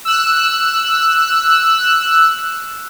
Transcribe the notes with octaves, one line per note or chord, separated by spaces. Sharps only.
E6 F#6